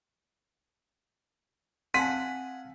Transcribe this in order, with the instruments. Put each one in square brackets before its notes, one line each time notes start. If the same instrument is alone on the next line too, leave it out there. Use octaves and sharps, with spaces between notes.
[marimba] C4 [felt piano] F5 G#5 A5 [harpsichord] F#5 [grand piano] B6